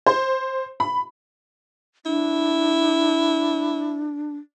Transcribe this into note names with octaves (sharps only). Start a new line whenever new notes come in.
C5
B5
D4 E4